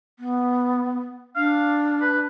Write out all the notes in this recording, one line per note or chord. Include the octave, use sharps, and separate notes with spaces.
B3
D4 F5
B4